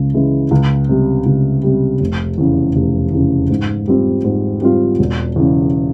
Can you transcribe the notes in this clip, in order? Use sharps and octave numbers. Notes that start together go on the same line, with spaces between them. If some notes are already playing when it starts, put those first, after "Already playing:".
Already playing: C#2 C#3
C#3 E3 G#3 E4
C#2
C3 G3
C#2
C3 G3
F1
E2 C#3
F1
E2 C#3
G#2
G3 C4 F4
G#2
G3 C4 F4
E1
E2 C#3